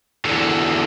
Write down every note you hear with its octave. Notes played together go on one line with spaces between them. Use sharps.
E2 D3